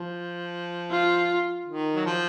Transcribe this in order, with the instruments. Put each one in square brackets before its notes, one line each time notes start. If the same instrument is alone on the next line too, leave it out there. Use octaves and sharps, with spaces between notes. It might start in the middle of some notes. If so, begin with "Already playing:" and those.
Already playing: [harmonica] F3
[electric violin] F4
[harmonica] D#3
F#3
F3